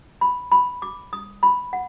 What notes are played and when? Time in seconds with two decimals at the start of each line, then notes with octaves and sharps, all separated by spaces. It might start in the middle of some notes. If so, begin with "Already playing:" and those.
0.21 B5
0.52 B5
0.82 D6
1.13 D#6
1.43 B5
1.73 F#5